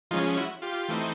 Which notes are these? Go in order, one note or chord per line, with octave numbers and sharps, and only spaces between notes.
F3 G#3 C#4 D#4 F4
E4 F#4
F4 G4
E3 A3 C4 D#4